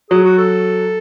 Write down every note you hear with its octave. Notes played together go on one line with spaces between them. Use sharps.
F#3 G#4
F#4
A4